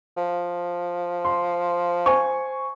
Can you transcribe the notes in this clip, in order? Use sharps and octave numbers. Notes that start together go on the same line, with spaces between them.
F3
C6
C5 G#5 C#6